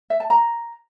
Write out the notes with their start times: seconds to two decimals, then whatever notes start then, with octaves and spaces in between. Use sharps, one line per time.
0.10 E5
0.20 A5
0.30 A#5